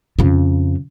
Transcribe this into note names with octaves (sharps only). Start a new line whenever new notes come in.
F2 C#3